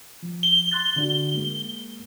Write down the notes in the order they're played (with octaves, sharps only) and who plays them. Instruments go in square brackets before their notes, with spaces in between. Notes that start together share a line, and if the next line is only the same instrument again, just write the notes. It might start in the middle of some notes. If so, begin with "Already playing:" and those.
[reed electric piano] F3
[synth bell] G7
[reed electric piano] C6 F#6 A6
D3 D4 F#4
G#3 A#3